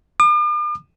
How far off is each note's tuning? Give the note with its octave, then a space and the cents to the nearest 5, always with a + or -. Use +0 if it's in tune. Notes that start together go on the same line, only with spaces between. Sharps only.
D6 +45